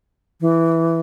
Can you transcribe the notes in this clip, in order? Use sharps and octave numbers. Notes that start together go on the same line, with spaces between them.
E3